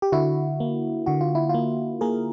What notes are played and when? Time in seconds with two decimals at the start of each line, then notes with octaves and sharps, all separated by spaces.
0.02 G4
0.12 D3 E4 F#4
0.60 A#3
1.06 D3 F#4
1.21 F4
1.35 E4
1.49 A#3 F4
2.01 A#3 G#4 A#4